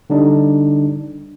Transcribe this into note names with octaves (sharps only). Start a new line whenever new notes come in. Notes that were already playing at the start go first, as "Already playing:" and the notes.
D3 G3 D4 D#4